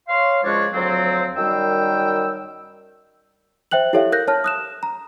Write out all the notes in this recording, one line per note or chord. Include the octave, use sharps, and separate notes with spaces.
C#5 F5 C6
C#2 F3 G#3 D4 F#4 C#5
D2 F3 F#3 C4
F#2 D#3 G3 G5 E6
C5 E5 G5 F#6 F#7
E4 G4 A4 C#5 E5 F5
A#4 F#6 G6 A#6
C#5 A5 F6
D#6 F#6 E7
A#5